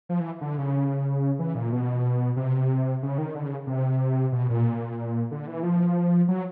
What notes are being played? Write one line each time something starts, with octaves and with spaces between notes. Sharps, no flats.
F3
E3
D3
C#3
E3
A#2
B2
C3
C#3
D#3
D3
C#3
C3
B2
A#2
D3
E3
F3
F#3